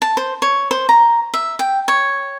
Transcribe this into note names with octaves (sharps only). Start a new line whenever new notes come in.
A5
C5
C#5
C5
A#5
E5
G5
C#5